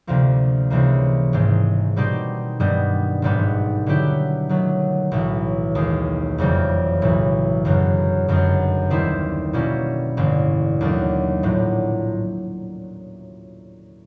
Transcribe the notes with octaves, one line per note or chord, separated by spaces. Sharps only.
D2 C3 F3 A#3
C#2 C3 E3 G3 A#3
G#1 G#2 D#3 G#3
B2 G3 C4 D#4 G4
G2 D#3 G3 B3
G#1 G#2 D#3 G3 B3
D3 F#3 B3 E4 G4
D#3 F#3 A3
B1 A2 E3
D#2 D#3 G#3
F#1 F2 C#3 E3 G3
B1 A2 E3
G1 F#2 C#3 F#3
G1 F#2 D#3 G#3
D#2 D#3 G3 C4 E4
B2 G3 A#3 C#4 E4
A1 G2 D3
D#2 D#3 F#3 A3 D4
A#1 A2 F#3